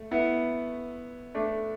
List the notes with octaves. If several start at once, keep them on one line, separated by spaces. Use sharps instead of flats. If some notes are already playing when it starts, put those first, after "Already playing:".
Already playing: A3
B3 E4
A3 D4